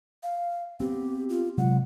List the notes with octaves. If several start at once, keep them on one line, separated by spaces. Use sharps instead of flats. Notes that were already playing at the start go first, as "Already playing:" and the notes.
F5
B3 C4 G4
F4
C3 F#3 G#3 F#5